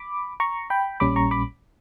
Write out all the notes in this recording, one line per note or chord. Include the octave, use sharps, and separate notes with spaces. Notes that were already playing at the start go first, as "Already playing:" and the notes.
Already playing: B5 D6
A#5 C#6
G5 B5
A#1 A#2 G3 C#4 B5 D6
A#5 C#6
B5 D6